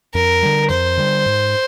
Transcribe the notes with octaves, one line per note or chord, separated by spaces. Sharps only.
F2 A#4
D3 G3
F2 C5
D3 G3
G#2